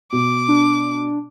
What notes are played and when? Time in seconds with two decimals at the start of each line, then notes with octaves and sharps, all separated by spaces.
0.13 B2 D6
0.48 D4